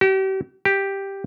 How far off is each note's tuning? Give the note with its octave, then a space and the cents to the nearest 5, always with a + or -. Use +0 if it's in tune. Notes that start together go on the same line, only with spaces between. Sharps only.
G4 -40
G4 +0